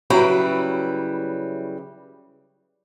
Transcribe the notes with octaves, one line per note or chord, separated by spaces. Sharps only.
C#3 F#3 G3 E4 B4 G5